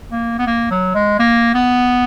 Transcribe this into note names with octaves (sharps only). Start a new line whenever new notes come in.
A#3
B3
A#3
F#3
G#3
A#3
B3